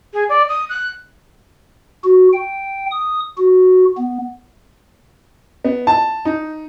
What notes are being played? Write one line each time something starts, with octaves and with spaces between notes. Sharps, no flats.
G#4
D5
D#6
F#6
F#4
G5
D#6
F#4
B3
B3
A5
D#4